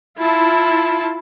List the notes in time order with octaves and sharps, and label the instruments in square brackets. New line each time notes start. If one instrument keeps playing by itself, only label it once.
[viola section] E4 F4 A5